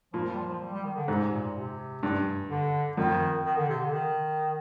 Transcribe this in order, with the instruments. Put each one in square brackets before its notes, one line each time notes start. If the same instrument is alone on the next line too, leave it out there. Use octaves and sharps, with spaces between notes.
[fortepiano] A#2 [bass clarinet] F3
[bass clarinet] G3
F3
F3
G3
G3
D#3
D3
[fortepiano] G#2 [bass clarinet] C3
[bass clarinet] A#2
C3
[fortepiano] G2
[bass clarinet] D3
[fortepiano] F2 [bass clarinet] D#3
[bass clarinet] D#3
D3
C3
D3
D#3